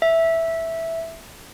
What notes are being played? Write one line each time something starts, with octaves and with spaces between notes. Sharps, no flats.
E5